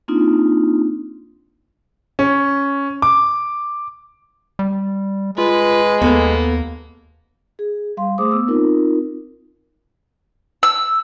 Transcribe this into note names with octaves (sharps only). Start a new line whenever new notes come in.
A#3 C4 D4 D#4 F4
C#4
D6
G3
G#3 F4 B4
D#2 A#3 B3 A4 B4
G#4
G3 F5 C6
A3 G#4 C5 D6 D#6
B3 E6
C4 D#4 F4 A#4
E6